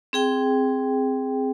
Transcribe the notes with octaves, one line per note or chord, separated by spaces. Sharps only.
C4 G#4 G5